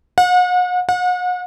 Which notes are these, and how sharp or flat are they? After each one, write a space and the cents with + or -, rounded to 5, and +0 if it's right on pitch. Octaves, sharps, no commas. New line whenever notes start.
F#5 -40
F#5 -40